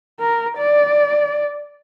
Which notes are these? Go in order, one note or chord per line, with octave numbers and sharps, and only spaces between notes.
A#4
D5